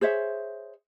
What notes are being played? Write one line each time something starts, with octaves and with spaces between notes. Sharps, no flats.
G#4 C5 C#5 E5